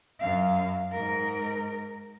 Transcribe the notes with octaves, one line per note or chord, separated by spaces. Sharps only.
F#2 F5
G#2 A#4